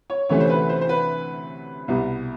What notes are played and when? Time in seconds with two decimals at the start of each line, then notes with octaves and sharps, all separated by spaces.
0.10 C#5
0.29 D2 C3 E3 A3 C#4 C#5
0.40 C5
0.50 B4
0.69 C5
0.81 C5
0.89 B4
1.88 C2 B2 G3 B3